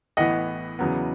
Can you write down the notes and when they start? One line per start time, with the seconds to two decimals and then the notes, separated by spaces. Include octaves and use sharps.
0.17 A1 A2 E3 B3 D#5 F#5
0.79 E2 C#3 F#3 B3